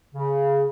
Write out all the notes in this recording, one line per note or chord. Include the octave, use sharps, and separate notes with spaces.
C#3